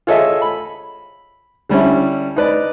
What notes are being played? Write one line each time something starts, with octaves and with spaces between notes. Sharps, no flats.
F4 G#4 A4 C#5 D#5 E5
B5
D3 G3 C#4 E4
D#4 B4 D5